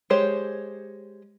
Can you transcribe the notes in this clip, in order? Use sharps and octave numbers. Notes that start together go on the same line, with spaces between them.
G#3 G4 C5 C#5